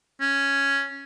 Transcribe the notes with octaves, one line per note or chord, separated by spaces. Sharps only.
C#4